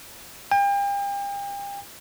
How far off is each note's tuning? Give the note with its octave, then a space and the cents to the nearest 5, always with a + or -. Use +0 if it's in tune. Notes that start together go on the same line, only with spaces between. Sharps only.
G5 +40